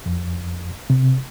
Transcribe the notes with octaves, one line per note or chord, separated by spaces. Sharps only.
F2
C3